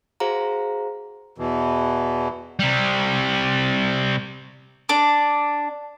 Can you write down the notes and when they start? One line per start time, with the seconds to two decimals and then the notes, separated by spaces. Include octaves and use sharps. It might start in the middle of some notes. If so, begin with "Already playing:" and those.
0.20 F#4 G#4 C5 F5 A#5
1.38 E2 B2 E3
2.60 C3 G3
4.89 D4